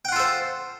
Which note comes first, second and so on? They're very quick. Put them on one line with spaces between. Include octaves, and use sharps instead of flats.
G5 F#5 F4 A4 C5